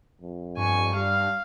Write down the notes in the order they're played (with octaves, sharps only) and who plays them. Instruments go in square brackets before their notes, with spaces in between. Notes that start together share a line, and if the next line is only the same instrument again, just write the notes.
[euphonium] F2
[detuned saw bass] G2 [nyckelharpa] G#5 C#6
[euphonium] G3 [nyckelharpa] F5